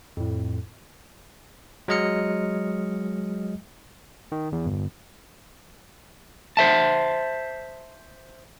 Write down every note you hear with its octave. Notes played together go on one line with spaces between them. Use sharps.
F2 A2
F#3 G#3 D#5 F6 C#7
D#3
E2
G1
C5 E5 A5